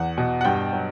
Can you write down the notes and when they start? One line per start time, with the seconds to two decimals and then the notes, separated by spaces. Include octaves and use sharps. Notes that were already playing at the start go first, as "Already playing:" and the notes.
Already playing: E2 F#5
0.18 B2
0.41 F#5
0.45 G2 G5
0.73 F#3